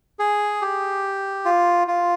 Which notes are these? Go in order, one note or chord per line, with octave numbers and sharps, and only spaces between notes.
G#4
G4
F4
F4